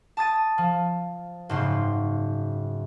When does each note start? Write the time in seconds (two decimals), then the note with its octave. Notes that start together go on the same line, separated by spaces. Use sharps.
0.17 A5 D#6 A6 D#7
0.58 F3
1.49 F#1 G#2 C#3 C6